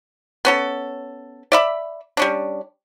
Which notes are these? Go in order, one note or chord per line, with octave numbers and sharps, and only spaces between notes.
B3 C#4 A4
D5 E5 B5
G3 C#4 D4